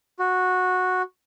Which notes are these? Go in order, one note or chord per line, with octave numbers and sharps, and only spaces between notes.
F#4